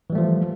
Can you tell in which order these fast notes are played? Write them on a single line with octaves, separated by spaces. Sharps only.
E3 G3 A3 F3